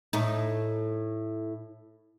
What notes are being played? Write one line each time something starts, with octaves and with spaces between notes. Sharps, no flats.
A2 A3 D#4